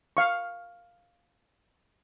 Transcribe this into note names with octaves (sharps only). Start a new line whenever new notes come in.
F5 C#6